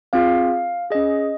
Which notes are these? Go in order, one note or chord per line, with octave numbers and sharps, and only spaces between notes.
C4 F4 G#4 F5
C#4 G#4 D#5